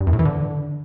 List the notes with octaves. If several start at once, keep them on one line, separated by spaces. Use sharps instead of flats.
G2
E2
A2
E3
D3